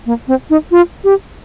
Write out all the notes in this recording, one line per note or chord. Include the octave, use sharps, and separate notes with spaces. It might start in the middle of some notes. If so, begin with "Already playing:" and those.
A#3
C4
D#4
F4
G4